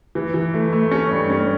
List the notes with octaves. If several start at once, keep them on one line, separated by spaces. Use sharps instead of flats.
E3
E3
A3
A3
C#4
G2
C#4